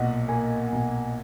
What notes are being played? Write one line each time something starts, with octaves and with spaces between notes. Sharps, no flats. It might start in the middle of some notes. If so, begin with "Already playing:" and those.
Already playing: B1 A#2 D#5 F#5
A#3 G#5
B1